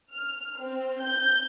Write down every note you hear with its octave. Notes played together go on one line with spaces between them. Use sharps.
F6
C4
G6